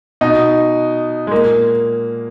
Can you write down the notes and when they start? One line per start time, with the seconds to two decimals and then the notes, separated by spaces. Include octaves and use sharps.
0.21 B2 D#4
1.27 G#3
1.31 A#2 A#3